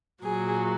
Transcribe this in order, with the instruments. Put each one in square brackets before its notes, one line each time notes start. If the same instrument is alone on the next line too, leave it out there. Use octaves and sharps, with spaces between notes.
[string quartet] A#2 F#3 G#4